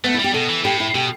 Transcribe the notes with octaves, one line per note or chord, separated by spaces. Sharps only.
A3 B3
E4
G3
G4
B2 A4
E3
A2 G4
E4
B2 G4